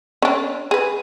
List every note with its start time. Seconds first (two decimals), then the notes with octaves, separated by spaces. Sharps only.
0.22 C#4 D4
0.71 G#4 B4